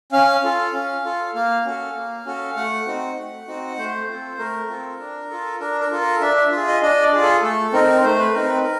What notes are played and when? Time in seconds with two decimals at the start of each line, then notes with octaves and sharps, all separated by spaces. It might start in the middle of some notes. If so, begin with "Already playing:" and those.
0.12 C#4 F5
0.44 F4 A4
0.73 C#4
1.05 F4 A4
1.35 A#3 F5
1.65 C#4 F#4 A4
1.95 A#3
2.26 C#4 F#4 A4
2.56 A3 F#5
2.86 C4 D#4 F#4
3.17 A3
3.48 C4 D#4 F#4
3.77 A3 C5
4.08 C4 F4 A4
4.38 A3 A#4
4.69 C4 F4 A4
5.00 D4
5.30 F4 A4
5.60 D4 A#4
5.81 A#4
5.91 F4 A4
6.01 A#4
6.21 D4 E5
6.36 E5
6.51 F4 E5
6.57 G#4
6.67 D#5
6.82 D4 D#5
7.02 D5
7.13 F4 G#4
7.22 A4
7.43 A3 A4
7.73 C4 D#4 A#4
8.03 A3 C5
8.18 B4
8.34 C4 D#4 A#4
8.49 B4
8.64 A#4